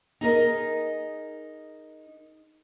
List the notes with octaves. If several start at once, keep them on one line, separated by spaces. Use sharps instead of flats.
D#4 G#4 A#4 D#5